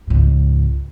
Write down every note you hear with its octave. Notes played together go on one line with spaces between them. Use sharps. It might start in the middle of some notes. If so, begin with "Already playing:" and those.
C#2 G#2